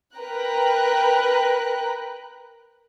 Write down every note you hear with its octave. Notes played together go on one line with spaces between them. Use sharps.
A#4 B4 G5 A#5 F#6